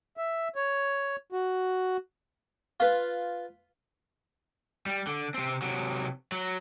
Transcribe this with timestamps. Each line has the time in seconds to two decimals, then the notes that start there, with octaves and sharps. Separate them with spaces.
0.17 E5
0.56 C#5
1.32 F#4
2.80 F4 B4
4.86 G3
5.07 D3
5.34 C3 C4
5.62 C3 F#3
6.32 F#3